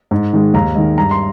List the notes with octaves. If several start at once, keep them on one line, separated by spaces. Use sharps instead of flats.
G#2
D#3 G#3
D#2 A#5
D#3 G#3
G2 A#5
C6